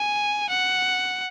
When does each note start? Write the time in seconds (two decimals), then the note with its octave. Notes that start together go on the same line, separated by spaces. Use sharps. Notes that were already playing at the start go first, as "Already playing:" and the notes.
Already playing: G#5
0.49 F#5